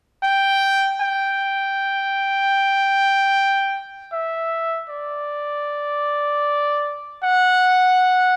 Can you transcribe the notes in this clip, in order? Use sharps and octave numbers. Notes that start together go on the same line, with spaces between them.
G5
G5
E5
D5
F#5